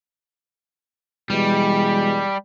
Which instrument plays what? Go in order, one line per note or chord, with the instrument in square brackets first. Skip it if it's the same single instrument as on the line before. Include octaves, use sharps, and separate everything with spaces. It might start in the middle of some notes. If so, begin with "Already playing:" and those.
[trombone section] B2 E3 G#3 [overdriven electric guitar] G3